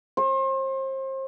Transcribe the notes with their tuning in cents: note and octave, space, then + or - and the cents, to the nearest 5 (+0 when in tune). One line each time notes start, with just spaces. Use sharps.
C5 +35